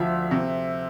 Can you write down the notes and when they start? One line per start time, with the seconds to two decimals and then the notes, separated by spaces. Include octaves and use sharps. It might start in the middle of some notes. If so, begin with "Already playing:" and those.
Already playing: D2 F3 E5
0.31 C3